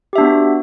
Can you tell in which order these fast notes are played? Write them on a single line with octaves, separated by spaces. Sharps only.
G4 E5 D4 B3 F#4